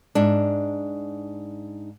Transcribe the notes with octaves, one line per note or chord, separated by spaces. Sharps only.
G#2 D4